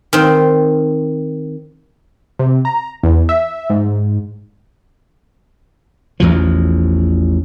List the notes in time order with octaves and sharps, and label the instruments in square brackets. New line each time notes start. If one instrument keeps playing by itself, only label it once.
[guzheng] D#3 C4
[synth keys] C3
A#5
E2
E5
G#2
[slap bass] A1 E2 B2 F3